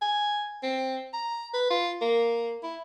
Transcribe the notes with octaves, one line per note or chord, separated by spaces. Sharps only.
G#5
C4
A#5
B4
F4
A#3
E4